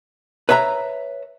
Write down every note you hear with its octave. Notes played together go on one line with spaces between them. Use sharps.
B4 C#5 E5 A5 A#5